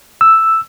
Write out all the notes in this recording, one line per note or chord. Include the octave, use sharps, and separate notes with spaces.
E6